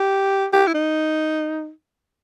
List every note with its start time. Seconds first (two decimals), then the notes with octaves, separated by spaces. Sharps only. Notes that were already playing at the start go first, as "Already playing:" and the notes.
Already playing: G4
0.53 G4
0.67 E4
0.74 D#4